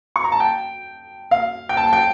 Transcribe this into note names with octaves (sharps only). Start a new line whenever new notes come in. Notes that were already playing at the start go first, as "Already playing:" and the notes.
C#6
A#5
A5
G5
F5
G5
A5
G5